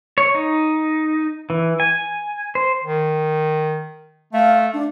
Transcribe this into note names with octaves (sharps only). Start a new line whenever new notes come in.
C#5
D#4
E3
G#5
C5
D#3
A3 F5
D4